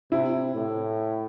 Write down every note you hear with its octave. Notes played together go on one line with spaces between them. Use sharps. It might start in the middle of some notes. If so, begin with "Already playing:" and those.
C3 E4
A2